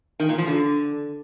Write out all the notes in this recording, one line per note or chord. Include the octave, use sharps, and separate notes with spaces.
D#3
A#2
F3
D3